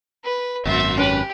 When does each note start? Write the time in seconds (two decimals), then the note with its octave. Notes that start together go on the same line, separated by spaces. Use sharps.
0.24 B4
0.65 G#1 F#2 A#2 E5 C6
0.97 C#4 G4 B4